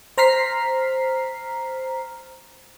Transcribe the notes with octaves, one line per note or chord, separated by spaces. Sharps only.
C5 A#5 F6 B6 C7